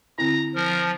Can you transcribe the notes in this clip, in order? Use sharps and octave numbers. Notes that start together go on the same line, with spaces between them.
D3 C4 E4 A#5
F3 A#4